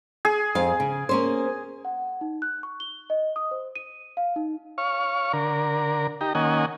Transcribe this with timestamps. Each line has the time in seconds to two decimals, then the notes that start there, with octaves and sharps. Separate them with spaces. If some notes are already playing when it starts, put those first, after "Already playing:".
0.25 G#4
0.55 F2 F5
0.80 C#3
1.09 A#3 C#4 C5
1.85 F#5
2.21 D#4
2.42 F#6
2.63 C#6
2.80 G7
3.10 D#5
3.36 D#6
3.51 C5
3.76 D#7
4.17 F5
4.36 D#4
4.78 C#5 F5 C#6
5.33 D3 A#4
6.21 D#4 G4 A#5
6.35 D#3 A#3 C#4 D#5 F#5 G#5